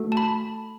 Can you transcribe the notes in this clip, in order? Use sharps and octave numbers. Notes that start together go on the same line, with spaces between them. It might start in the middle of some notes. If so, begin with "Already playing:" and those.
Already playing: A3 F#4 A4
A5
B5